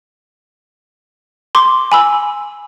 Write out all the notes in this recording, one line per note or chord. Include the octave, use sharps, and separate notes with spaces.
C6 D6
G#5 B5 E6